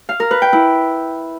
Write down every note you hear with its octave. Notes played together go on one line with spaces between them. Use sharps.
F5
A#4
B4
G5
E4